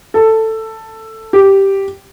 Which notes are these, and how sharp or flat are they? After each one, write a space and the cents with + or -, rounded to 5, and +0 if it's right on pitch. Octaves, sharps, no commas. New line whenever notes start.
A4 +10
G4 -5